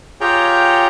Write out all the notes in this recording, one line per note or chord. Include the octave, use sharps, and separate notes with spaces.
F4 G4 G#4 C#5 G5 A#5